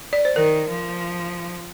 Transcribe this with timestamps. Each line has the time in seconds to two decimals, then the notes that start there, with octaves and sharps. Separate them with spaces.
0.13 D5
0.25 C5
0.36 D#3 A#4
0.69 F3